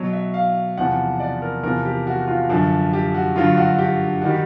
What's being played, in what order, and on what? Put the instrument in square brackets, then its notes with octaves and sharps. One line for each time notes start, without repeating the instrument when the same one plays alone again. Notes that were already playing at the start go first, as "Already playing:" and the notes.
Already playing: [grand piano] B2 F#3 C#5
E5
F5
E2 C3 F3 F#5
D5
A#4
E2 C3 F3 A#4
G4
F#4
F4
F#2 D3 F3
G4
F#4
G2 D3 F#3 F4
F#4
G4
D#3 G3 F#4
G4